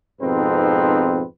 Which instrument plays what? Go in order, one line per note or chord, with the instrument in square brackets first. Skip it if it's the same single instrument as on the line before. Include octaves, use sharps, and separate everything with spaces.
[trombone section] F2 G#2 B2 C4 D#4 B4